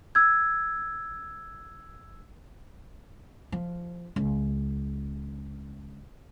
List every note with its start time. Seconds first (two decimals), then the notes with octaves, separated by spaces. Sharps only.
0.15 E6 G#6
3.52 F3
4.16 C#2